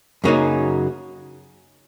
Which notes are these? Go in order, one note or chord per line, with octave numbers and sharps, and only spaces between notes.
F#2 C#3 F#3 A#3 D#4